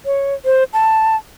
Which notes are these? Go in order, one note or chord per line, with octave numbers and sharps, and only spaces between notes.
C#5
C5
A5